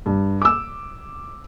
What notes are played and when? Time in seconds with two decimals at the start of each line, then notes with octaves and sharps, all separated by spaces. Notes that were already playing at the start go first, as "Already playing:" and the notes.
0.06 G2
0.42 D6 E6